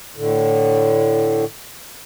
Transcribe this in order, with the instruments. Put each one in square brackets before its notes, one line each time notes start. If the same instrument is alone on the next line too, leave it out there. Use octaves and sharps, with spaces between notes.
[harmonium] A2 D3